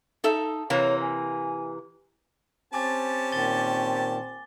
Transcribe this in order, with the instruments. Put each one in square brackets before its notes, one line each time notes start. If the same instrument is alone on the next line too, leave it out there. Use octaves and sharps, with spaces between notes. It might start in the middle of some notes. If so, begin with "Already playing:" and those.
[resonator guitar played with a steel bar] D#4 A4 E5
[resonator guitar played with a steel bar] C3 E3 A#3 [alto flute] C#5
[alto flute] G#5
[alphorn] C4 [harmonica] C#4 G4 A5 [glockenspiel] G#5 D6 A6
[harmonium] A#2 D#3 [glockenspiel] A6 G7